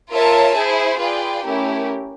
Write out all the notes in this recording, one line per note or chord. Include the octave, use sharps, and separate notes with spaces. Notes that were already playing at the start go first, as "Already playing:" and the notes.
F4 A#4 C#5 E5 A5
E4 G#4 C5
F4 G#4 B4 D5 G5
A3 C#4 E4 G4 A#4